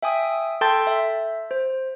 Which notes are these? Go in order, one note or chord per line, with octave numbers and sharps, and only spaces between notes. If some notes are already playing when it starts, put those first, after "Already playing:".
E5 G5 G#5 D#6
A4 G5 A5 C6 G6 A6
E5
C5